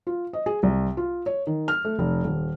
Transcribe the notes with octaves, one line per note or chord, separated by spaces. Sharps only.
F4
D#5
G#4
C2
F4
C#5
D#3
F6
A3
F1
D#1